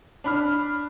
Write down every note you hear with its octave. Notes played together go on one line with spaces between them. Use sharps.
D4 B5 F6